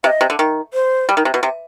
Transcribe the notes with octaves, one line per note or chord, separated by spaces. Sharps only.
C3 F5
D#5
C3
D3
D#3
C5
G3
D#3
C3
B2
C3